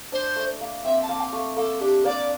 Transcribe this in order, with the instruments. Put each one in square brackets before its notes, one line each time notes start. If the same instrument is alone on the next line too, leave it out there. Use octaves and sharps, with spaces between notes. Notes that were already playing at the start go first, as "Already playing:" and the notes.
[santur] D4 [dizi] C5
[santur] A3
A#3
[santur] C4 [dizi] E5
[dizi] A5
[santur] A#3
[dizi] F5
[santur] A3
[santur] A#3 [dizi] A4
[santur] D4 [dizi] G4
[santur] A#3 [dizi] D5